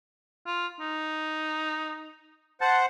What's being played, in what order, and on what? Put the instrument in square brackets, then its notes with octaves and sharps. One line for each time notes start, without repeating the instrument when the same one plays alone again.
[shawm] F4
D#4
[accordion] C5 F#5 [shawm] A5